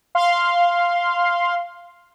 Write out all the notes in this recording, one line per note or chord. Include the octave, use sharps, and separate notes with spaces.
F5 C6